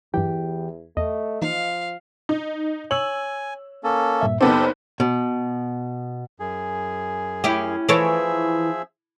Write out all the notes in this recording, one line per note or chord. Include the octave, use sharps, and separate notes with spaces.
E2 G2 E3 F#3 E4 G4 G5
E2 A3 D#5
E3 F3 A#3 D#4 F5
D#4
C#5 G#5 E6 F#7
A#3 C#4 A4
G2 A#2 E5
F#1 B3 C4 D#4 G4 A4
B2
F#2 G#4
C#4 E4 G4
E3 F3 G#4 A4 C#5 E5